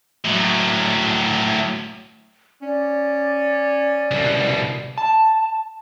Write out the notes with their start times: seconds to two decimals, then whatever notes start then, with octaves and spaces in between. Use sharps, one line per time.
0.25 A2 F#3
2.62 C#4 D5
4.11 C2 B2
4.98 A5